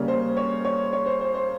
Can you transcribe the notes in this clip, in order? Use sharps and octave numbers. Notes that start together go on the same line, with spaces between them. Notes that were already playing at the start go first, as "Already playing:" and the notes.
Already playing: C#3 G3 A#3 C#4
C5
C#5
C#5
C#5
C5
C5
C5